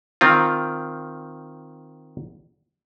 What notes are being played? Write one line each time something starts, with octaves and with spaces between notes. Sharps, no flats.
D#3 C4 F4